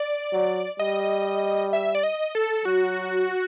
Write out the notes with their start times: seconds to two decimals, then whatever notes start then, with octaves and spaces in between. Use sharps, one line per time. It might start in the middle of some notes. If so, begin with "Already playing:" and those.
Already playing: D5
0.32 F#3
0.79 G3 D#5
1.73 E5
1.95 D5
2.03 D#5
2.35 A4
2.65 F#3 F#4